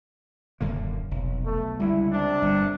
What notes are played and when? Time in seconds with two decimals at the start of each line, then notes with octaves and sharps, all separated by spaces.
0.61 D#1 F#2 D3 A#3
1.11 F1 B1
1.44 A3
1.80 C#2 D3 G3 E4
2.12 C3 D4
2.42 G1 A#2 G3